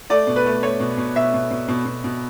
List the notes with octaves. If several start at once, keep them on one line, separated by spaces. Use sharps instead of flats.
A3 D5
B2
B4
A3
A3 C#5
B2
B2
B2 E5
B2
B2
B2
B2
B2